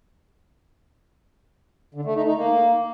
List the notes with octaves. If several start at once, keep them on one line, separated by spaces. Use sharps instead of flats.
D3
A3
D#4
D#4
A#3